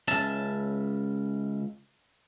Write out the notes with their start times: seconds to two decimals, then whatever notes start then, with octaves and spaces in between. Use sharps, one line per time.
0.08 C#2 C#4 E5 A5